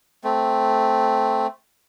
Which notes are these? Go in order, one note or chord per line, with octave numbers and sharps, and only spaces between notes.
A3 C4